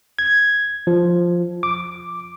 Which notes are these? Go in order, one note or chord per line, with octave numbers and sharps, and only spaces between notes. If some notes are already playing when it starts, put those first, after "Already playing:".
G#6
F3
D6